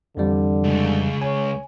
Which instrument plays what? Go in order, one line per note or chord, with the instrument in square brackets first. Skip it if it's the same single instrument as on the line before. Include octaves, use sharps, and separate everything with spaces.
[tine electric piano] F2 E3 G3 [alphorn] D3
[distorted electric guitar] C#2
[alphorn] C#5 [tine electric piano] G#5